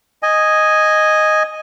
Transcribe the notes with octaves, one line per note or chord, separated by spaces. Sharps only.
D#5 G#5